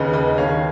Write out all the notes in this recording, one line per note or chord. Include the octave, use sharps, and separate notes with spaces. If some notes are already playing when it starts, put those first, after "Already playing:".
Already playing: D#2 C#3 B4 D#5
B4 D#5
D#2 D#3 C#5 F5